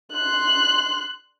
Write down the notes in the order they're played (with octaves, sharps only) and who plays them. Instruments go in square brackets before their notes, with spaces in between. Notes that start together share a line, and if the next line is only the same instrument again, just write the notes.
[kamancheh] C6 F#6